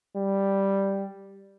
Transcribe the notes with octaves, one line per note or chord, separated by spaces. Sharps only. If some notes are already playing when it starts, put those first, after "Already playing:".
G3